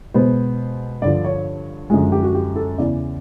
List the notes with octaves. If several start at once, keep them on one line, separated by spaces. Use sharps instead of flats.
B2 G#3 B3 C5
G2 D3 F3 D5
C#5
F#2 D3 F3 G#3 G#4
G4
F#4
G4
A4
E2 C#3 E3 D5